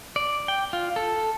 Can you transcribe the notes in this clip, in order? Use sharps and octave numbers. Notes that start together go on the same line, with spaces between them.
D5
G5
F4
A4